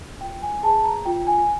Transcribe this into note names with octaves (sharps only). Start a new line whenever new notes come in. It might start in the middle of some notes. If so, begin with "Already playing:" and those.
F4 G5
G#5
G#4 B4 A5
A#5
F4 G5
G#5